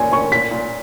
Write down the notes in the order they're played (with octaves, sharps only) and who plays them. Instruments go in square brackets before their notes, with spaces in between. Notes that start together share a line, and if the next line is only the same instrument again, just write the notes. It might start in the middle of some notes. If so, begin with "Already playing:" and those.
Already playing: [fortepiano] A#2 C#4 [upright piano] G#5
[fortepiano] C#4 [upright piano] C#6
[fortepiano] A#2 [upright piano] B6
[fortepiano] A#2